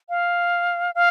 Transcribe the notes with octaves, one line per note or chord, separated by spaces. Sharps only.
F5
F5